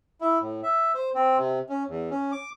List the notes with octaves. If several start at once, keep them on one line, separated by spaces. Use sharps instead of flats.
E4
A2
E5
C5
C4
C3
C#4
E2
C#4
D6